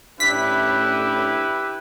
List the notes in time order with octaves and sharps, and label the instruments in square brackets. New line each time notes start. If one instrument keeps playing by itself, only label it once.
[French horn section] A2 C#4 D4 [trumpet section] E4 G4 B4 [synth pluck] B6